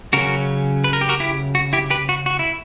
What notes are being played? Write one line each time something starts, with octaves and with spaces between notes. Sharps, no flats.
C#3 F#3 C#4 F#4 A#4
B4
A#4
G4
F#4 A#4
E4 G4
F#4
E4 G4
G4 B4
F#4
F#4
E4